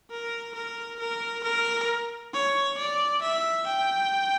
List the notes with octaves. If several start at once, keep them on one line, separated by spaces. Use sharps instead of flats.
A#4
A#4
A#4
A#4
C#5
D5
E5
G5